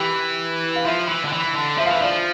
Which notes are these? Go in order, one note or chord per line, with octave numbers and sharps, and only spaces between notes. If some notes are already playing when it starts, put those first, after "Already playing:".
Already playing: E3 G4
F5
F3 E5
E3
D3
E3
D3
F3 E5
F5
E3 E5
F3 D5